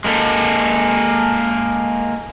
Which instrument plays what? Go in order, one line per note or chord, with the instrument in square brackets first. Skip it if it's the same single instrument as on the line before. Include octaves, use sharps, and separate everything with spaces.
[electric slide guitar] G#3 A#3 D4 A4